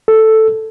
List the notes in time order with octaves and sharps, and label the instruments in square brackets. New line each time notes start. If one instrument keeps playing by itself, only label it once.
[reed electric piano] A4